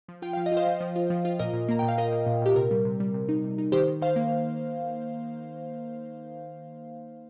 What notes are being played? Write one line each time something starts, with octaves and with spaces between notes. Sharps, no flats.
F3
F4 G5
F3 F5
D#5
F4
C5 F5
F3
F3
F4
F3
F4
A#2 A#4 D#5
A#2
A#3 A#5
A#2 G5
F5
F4 A#4 D#5
A#3
A#2
A#2 G4
C3 A#4
G3
C3
G3
C3
D#4
C3
D#4
D#3 G4 C5
D#3
D#3 C5 F5
A#3